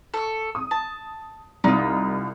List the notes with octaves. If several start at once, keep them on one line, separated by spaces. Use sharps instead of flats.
A4 C#6
D#6
A5
C2 D#4 F4